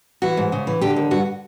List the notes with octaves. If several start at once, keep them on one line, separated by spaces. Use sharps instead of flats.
E3 F#4
G#2
C#3
E3
D3 G4
D#2
G2 F#4